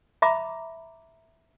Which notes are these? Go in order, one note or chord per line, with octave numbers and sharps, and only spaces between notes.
E5 A#5 B5 D6